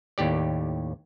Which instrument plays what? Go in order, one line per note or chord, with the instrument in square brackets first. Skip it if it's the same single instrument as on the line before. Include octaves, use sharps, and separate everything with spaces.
[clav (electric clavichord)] D#2 A2 G4 D5